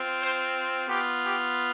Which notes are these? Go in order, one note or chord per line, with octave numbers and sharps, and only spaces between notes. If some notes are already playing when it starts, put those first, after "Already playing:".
Already playing: C4 F4
C5
B3 F4 G4
G4